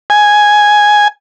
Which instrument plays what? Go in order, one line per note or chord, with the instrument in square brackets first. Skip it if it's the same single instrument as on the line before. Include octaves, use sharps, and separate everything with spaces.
[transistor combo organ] G#5